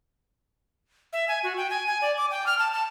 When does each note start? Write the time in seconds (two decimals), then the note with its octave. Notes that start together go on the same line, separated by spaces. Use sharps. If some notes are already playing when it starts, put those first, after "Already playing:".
1.13 E5
1.28 G#5
1.43 F#4
1.57 G5
1.70 G#5
1.87 G#5
2.01 D5
2.17 D6
2.31 G5
2.46 F6
2.59 A5
2.73 A5